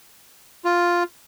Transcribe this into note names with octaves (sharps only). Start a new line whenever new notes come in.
F4